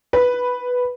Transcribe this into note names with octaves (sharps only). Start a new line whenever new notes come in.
B4